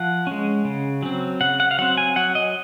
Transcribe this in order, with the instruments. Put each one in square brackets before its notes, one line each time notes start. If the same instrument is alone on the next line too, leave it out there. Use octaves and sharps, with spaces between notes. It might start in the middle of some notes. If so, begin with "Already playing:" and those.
Already playing: [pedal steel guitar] F3 F#5
G#3 C#4
C#3
F#3 C4
C#3 F#5
F#5
F5
F#3 C4 F#5
G#5
F#3 F#5
D#5